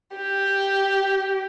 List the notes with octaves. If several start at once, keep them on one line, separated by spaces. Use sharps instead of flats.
G4